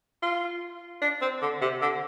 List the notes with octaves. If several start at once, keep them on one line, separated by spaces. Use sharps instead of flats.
F4
D4
C4
D3
C3
D3